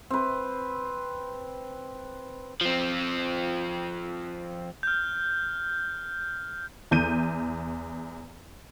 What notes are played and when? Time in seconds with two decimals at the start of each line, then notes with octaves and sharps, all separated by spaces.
0.11 C4 B4
2.61 F3 C4
4.83 F6 G6
6.91 E2 G6 D#7